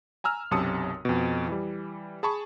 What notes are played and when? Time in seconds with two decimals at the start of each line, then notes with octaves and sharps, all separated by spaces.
0.24 G#5 A#5 E6 F6
0.51 B1 F#2 C3 A5 D#6 C#7
1.05 F2 B2
1.48 E3 G3
2.23 G#4 A5 B5 C#6